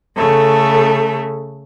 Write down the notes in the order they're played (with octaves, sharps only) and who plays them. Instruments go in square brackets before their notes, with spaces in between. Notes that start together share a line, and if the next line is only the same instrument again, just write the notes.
[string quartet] C#3 A3 A4